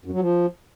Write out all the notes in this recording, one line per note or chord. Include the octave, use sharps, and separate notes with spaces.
F#2
F#3
F3